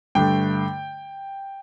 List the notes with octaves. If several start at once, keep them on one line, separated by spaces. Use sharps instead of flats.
G2 D3 A3 G5